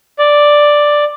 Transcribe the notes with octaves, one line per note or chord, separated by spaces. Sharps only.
D5